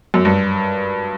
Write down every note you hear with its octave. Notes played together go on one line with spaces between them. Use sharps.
F#2
G2